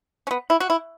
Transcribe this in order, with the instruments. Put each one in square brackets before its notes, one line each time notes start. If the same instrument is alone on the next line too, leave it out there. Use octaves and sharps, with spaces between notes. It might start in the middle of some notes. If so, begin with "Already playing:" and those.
[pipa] C#4
B3
E4
F#4
E4